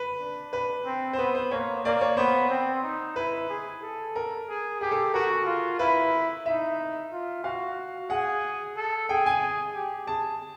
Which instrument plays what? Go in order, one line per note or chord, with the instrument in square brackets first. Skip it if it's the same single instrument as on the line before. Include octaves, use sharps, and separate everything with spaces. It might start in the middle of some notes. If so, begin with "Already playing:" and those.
Already playing: [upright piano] B4
[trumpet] D4
[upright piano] B4
[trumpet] C4
[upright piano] C5
[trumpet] B3 [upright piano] B4
[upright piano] C5
[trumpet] A#3 [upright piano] C#5
[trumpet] A#3 [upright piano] D5
[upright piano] C#5
[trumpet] B3 [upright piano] C5
[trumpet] C4
D#4
[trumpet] E4 [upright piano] B4
[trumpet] G#4
A4
[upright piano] A#4
[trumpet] G#4
[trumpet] G4 [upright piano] G#4
[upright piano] A4
[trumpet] F#4 [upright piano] A#4
[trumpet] F4
[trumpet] E4 [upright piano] B4
[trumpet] D#4 [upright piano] E5
[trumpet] F4
[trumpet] F#4 [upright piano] F5
[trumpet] G#4 [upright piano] F#5
[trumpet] A4
[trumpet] G#4 [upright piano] G5
[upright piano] G#5
[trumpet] G4
[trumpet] G#4 [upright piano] A5